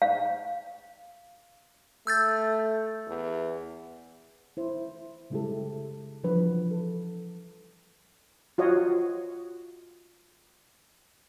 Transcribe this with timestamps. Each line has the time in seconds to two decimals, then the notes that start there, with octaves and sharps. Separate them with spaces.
0.02 F5
2.07 A3 E6 G6 A6
3.07 E2
4.57 E4 C5
5.30 C#3 G3 G#3 E4 G4 A4
6.23 E3 F3 G3 D4 B4
6.71 A4
8.58 F4 F#4 C#5 D#5